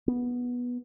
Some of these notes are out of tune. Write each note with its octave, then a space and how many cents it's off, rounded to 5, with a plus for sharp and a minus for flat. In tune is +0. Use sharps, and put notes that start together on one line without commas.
B3 -10